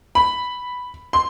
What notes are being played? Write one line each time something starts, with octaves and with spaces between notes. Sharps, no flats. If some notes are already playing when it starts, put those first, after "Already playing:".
B5
C6